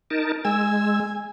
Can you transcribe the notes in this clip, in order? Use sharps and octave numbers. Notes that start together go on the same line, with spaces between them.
D#4 A#4 A5
G#3 G#5 E6